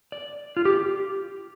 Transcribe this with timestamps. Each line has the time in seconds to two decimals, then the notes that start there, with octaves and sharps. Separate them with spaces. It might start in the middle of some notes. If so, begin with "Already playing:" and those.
0.12 D5
0.57 F4
0.65 G4